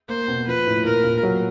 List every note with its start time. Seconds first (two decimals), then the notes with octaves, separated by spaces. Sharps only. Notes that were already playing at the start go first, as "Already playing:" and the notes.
0.08 A#3 C5
0.28 B2
0.47 F3 B4
0.67 A2
0.85 A#2 A#4
1.04 A#2
1.23 F#3